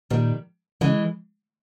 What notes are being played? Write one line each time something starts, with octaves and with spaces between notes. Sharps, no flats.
A#2 D#3 G3
C#3 E3 G#3